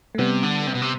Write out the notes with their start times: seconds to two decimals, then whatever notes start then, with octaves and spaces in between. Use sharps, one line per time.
0.15 A3
0.18 C3 G3 B3
0.43 D3
0.67 C3
0.74 B2
0.82 C3